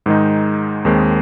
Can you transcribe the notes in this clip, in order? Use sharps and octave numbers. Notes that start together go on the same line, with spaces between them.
G#2 D#3 G#3 D#4
D#2 D#3 G#3 C4